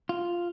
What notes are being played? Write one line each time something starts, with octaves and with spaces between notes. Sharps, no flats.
F4